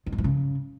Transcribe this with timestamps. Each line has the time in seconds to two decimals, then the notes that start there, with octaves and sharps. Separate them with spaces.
0.06 D#3
0.12 G#2
0.18 E3
0.24 C#3